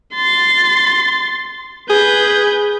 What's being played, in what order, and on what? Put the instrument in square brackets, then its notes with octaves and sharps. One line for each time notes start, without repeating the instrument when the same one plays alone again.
[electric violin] C6 A6
[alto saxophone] G#4 [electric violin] B4 G6